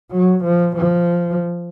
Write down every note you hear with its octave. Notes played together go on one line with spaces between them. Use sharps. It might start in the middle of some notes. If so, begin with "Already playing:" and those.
F#3
F3
F3